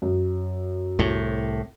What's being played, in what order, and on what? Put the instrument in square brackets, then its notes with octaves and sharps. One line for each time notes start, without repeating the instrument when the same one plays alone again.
[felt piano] F#2
[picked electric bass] C2 A2